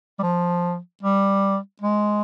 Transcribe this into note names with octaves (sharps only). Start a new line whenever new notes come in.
G3
F3
G3
G#3